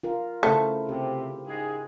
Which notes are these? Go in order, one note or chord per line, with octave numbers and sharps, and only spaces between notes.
F4 A#4
C#3 A3 E4 C5
C3 G4
G#2 G#3 G#4